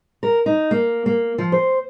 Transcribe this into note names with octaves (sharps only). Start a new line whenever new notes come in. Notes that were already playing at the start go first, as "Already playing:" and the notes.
A#4
D#4
A#3
A#3
F3
C5